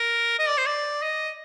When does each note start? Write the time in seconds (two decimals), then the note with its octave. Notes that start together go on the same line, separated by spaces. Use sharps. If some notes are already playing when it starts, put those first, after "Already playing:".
Already playing: A#4
0.39 D#5
0.49 D5
0.58 C5
0.66 D5
1.02 D#5